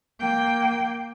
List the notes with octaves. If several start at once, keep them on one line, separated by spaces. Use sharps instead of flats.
A#3 G5